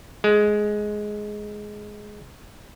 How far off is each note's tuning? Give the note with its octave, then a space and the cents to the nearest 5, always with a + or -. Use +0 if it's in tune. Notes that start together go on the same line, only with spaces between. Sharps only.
G#3 +10